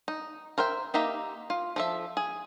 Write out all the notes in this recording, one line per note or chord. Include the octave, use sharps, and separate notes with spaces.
D#4
A#4 C5 E5 G5
A#3 D#4 G4 E5 A#5
F4
F3 A4 E5
G#4